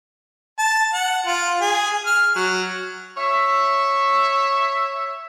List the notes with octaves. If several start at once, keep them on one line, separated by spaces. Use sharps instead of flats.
A5
F#5
F4
G#4
F6
F#3
C#5 E5